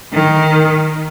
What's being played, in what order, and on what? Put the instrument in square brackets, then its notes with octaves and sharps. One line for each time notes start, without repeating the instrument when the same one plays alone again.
[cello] D#3